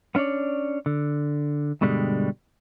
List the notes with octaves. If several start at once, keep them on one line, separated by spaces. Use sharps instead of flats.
B3 C#4 D4 C#5 D5
D3
G2 B2 D3 G3 G#3